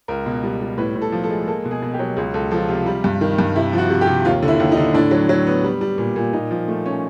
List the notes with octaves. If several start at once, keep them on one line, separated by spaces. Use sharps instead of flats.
C#2 A#4
B2
G3
G3
A2 B4
A2
A4
F3
A4
G#3
A#3 A4
B2
G#4
B2
G4
F#3
C#2 G#4
C#2 A4
F3 A4
C3 F4
G3
G2
D#3
G2
C3 E4
F3
F#4
C3
G4
C3
D#2 F4
D3
E4
D#2
D#4
D3
A2 D4
F#3
F#3
B3
G3
G3
A#2
A#2
A#2 D#4
F3
A3
C#4